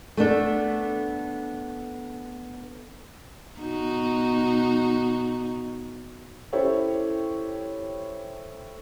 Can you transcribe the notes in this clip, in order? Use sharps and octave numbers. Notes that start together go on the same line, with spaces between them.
A3 B3 D4 A4
B2 D#4 F#4
C#4 E4 G4 A4 C5 C#5